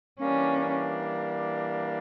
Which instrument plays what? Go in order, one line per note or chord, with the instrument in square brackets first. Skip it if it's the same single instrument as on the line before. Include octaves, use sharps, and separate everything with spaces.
[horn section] E3 G3 A#3 D4 [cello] C#4